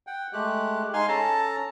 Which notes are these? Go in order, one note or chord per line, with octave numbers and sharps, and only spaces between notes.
F#5 G5
G#3 A3 G4 F#6
G#3 D#4 F5 G#5 C6 F6
C#4 A4 A5 A#5